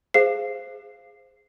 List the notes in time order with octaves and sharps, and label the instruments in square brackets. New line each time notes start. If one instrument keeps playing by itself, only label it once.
[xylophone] G#4 C5 F5 C7